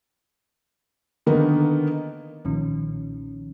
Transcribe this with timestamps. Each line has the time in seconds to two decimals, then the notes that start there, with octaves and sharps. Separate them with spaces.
1.26 D3 D#3 A#3 B3 D#4
2.45 B1 A#2 D#3 F3 C#4